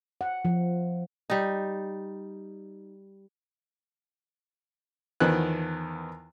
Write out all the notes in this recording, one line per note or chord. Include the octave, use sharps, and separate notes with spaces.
F#5
F3
G3 D#4
E2 D#3 F3 B3 F#6